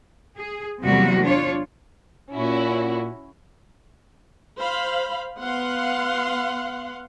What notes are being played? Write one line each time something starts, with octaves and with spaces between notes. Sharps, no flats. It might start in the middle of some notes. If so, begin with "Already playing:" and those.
G#4
E2 C3 F#3 G3 A#3 F#4
D4 F4 C#5
A#2 C#4 E4 F#4
C5 F5 B5
B3 F5 F#5 C6